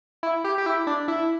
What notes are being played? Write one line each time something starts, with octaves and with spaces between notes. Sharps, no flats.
E4
G4
G4
E4
D4
E4